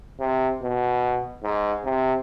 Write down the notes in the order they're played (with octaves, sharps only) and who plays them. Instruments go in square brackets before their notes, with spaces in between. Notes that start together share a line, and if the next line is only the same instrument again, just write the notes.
[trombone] C3
B2
G#2
C3